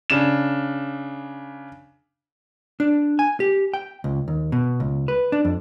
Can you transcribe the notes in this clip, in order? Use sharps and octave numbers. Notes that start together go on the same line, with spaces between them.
C#3 D4 E7
D4
G#5
G4
G5
C#2
D#2
B2
C#2
B4
D4
F2